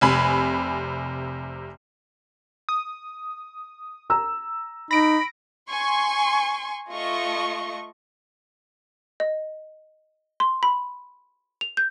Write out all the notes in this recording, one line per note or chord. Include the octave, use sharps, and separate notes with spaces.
F1 C3 G#5 B5
D#6
A#5 E6
D#4 B5 A#6 D7
G#5 C6 C#6
A3 F4 D#5 C#6
D#5
C6
B5
F7
G6